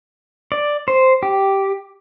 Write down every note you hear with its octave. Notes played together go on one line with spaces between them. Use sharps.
D5
C5
G4